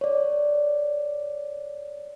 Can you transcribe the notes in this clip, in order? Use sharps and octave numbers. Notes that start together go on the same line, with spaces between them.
C#5 D5